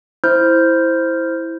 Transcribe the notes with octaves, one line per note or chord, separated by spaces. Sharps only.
E4 C5 F6 G6